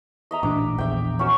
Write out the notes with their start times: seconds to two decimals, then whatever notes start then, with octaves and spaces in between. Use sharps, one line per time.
0.31 D#5 E5 A#5
0.43 A1 A#2 D4 D6
0.78 A#1 E2 E5 G5
1.19 C#4 F#4 E6